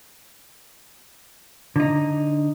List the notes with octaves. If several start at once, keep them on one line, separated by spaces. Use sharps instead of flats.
D3 D#4